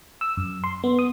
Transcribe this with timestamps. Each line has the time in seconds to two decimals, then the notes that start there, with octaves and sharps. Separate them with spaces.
0.21 E6
0.37 F#2
0.64 C6
0.84 B3
0.99 D#6